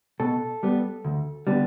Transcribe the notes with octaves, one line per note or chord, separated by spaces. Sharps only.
B2 A4
G3 B3
D2
D3 G3 B3